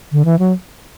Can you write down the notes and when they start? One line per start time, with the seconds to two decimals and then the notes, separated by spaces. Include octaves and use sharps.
0.12 D3
0.25 E3
0.39 F#3